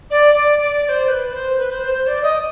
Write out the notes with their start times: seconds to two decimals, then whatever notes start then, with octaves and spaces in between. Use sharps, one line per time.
0.10 D5
0.34 D5
0.59 D5
0.84 D5
0.88 C5
1.08 B4
1.32 C5
1.57 B4
1.69 C5
1.82 C5
1.94 C5
2.06 D5
2.22 D#5